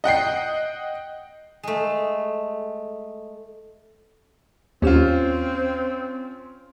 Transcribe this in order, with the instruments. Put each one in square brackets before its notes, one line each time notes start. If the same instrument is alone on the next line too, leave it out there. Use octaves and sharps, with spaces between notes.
[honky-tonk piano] D#5 F#5 G5 C7
[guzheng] G#3 A3
[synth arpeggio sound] D#2 G4 E7 [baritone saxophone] C4 [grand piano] C#4 F4